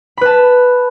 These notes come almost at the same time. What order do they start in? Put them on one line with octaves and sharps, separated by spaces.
B5 B4 A5